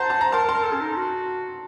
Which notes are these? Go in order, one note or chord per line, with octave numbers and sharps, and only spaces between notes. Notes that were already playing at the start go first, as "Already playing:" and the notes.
Already playing: C5 F#5 A5 A#5 C6
A5
A#5
A#4 A5 C6
A#4
A5 C6
A#4
A4
C#4
D#4
F#4